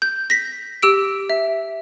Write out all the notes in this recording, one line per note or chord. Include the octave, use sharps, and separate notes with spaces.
G6
A#6 B6
G4 E6 D7
E5